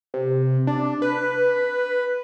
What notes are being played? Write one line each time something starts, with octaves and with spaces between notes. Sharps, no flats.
C3
D4
B4